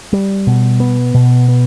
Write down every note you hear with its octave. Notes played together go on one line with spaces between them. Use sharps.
G3
B2
B3
B2
B3